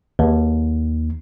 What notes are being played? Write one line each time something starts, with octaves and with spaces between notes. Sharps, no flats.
D#2